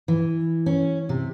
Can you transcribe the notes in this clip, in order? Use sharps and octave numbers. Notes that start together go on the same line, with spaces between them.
E3
C#4
C3